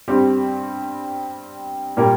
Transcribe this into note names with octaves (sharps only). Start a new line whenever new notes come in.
G2 G3 C4 G4
A#2 G3 A#3 G4 A#4